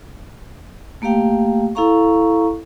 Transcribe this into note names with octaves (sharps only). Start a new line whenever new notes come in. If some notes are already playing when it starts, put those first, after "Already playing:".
A3 A#3 G4 F5 G5
E4 A4 F5 A#5 C#6